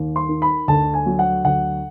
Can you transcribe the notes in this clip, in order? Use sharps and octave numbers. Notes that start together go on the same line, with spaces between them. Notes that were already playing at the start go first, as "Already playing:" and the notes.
Already playing: D#2
C6
D#3
B5
D2 A5
G#5
F#3
F#5
D2 F#5